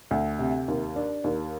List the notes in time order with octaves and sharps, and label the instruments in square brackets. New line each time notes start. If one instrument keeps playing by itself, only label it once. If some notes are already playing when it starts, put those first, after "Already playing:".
[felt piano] D2
C3
D#2
D4
D#2